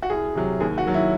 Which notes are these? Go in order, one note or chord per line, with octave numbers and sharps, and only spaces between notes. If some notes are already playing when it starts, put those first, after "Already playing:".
F#4
C2 G#4
C3 F#3
D#2 G#4
F#4
D#3 F#3
E4